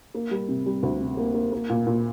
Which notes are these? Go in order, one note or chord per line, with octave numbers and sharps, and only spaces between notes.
A#3
G3
C3
G3
D2
C3
A#3
A#3
A#3
A#2
A#2